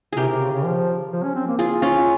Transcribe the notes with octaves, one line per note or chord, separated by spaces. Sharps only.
C3 G4 G#4 A#4
C3
C#3
C#3
F3
F3
C#4
C4
A#3
F4 G#4
C#4 F4